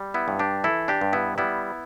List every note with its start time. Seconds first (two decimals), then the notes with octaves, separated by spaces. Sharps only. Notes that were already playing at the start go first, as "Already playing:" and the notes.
Already playing: G3
0.14 B3 E4
0.28 G2
0.39 D4 G4
0.64 E3 E4 A4
0.88 D4 G4
1.01 G2
1.13 B3 E4
1.38 G3 B3 E4